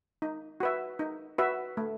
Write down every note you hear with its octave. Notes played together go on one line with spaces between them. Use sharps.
D#4
F#4 B4 E5
D#4
F#4 B4 E5
A3